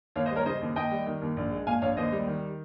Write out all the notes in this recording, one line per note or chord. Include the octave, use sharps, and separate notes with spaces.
D#2 C#5 F5
C5 D#5
G3 A#4 C#5
C#3 C5 D#5
D#2
D#2 D#5 G5
G3
D#3
D#2
A#1
G#3
A#2 F5 G#5
A#1 C#5 F5
D#2 C5 D#5
G3
D#3